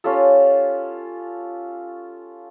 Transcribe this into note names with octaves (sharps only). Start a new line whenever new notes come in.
C#4 F4 G4 A4